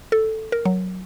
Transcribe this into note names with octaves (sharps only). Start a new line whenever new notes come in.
A4
A#4
F#3